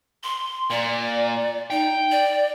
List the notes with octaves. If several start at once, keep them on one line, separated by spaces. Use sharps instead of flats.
C6
A#2 D5
D#4 G5
D5